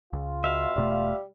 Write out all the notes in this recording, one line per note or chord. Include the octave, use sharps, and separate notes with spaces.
C#2 F4
B2 E5 F5
E1 B2 G3 A3